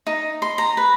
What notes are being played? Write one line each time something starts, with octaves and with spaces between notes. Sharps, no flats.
D#4
C6
A#5
B4